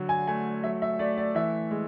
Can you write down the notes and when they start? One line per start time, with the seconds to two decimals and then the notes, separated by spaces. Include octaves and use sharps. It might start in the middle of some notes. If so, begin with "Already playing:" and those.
Already playing: D3 F#3
0.09 G#5
0.28 A3 G#5
0.63 F#3 E5
0.82 E5
0.99 A3 D5
1.17 D5
1.35 E3 E5
1.71 G#3